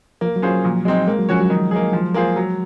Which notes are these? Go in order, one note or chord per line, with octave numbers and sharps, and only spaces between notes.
F3 A#3
F#3
C#4 F4 G#4 C5
F#3
A#2 F3
F#3 G#3 C4 D#4
G#3 A#3
F#3
F3 C#4 F#4 C#5
F#3
D#3
A#3 D#4 G#4
F3
A#3 F4 G#4 C5
F#3